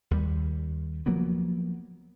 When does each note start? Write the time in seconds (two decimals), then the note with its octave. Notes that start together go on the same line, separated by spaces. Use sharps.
0.11 D#2 G3
1.06 F3 F#3 A#3 B3